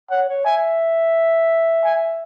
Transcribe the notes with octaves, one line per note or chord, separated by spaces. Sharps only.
C#5 F#5
C#5
E5 G#5
G#5